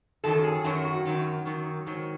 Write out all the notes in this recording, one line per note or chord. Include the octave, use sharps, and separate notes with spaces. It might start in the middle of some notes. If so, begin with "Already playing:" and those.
F#2 D#3 F#3 A4
G#4
F#2 D#3 F#3 F#4
F#4
F#2 D#3 F#3
F#2 D#3 F#3
G#2 D#3 F#3